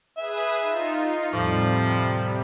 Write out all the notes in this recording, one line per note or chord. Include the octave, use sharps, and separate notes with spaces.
G#4 B4 E5 D#6
D#4 F4
E2 A2 C3 F3 G3